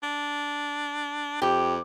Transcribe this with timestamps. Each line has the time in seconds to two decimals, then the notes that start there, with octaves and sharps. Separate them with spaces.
0.03 D4
1.42 F2 G4